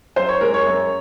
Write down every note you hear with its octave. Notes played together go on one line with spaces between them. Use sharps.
F#2 C5
C#5
G#3 A#4
C#5
F#2